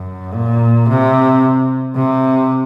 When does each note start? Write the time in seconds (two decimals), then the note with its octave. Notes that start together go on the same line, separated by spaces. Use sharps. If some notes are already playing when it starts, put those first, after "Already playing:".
Already playing: F#2
0.34 A#2
0.89 C3
1.96 C3